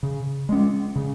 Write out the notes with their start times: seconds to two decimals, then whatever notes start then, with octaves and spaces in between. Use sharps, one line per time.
0.03 C#3
0.49 G#3 C#4
0.96 C#3